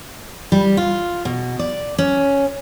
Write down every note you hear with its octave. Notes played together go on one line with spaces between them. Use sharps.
G3
F4
B2
D5
C#4